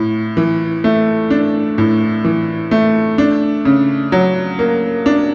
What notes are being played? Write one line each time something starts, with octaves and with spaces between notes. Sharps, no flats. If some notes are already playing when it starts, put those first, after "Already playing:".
Already playing: A2
E3
A3
D4
A2
E3
A3
D4
C#3
F#3
A#3
D4